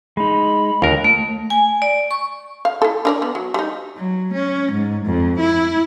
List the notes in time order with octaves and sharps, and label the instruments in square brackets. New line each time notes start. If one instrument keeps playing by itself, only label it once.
[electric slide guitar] G#3 D#4 [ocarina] B5
[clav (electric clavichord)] D#2 A#4 [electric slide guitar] D3 F4
[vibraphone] A3
G#5
D5
C#6
[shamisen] F5
E4 A4
D4 A#4 D5
B3
F#3
G3 D#4
[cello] F#3
C#4
G#2
F2
E4